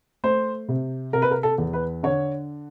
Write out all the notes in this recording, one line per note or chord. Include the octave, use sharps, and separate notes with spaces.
A3 C5
C3
C3 A#4
B4
A#4
A4
E2
B4
D3 C#5